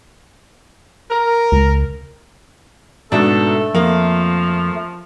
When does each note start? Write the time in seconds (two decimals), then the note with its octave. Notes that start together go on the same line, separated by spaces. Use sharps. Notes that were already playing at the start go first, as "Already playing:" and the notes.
1.11 A#4
1.52 C#2
3.12 G#2 B2 A3 D4 A4
3.75 F2 F3 A#3